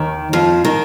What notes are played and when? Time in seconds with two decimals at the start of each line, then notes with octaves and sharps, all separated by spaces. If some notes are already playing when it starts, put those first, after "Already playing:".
Already playing: D#2 D#3
0.33 F2 F3
0.65 D#3